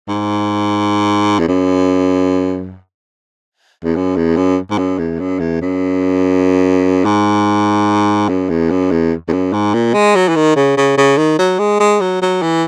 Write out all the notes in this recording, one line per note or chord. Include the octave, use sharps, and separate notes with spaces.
G#2
E2
F#2
E2
F#2
E2
F#2
G#2
F#2
E2
F#2
E2
F#2
G#2
F#2
E2
F#2
E2
E2
F#2
G#2
A#2
G#3
F#3
E3
D#3
C#3
C#3
C#3
D#3
F#3
G#3
G#3
F#3
F#3
E3